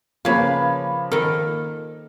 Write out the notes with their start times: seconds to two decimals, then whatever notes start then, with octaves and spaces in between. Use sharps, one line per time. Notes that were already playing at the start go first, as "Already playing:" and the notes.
0.25 C#3 F3 A#3 B4 C#5 F5 B5
1.12 D#3 A4 A#4